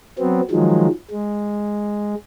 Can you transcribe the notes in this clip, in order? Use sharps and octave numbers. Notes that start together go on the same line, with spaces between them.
F#3 B3 C4
D#3 F3 F#3 G#3
G#3